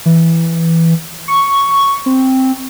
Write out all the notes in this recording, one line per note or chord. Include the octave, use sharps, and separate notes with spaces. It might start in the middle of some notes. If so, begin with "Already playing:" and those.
E3
C#6
C4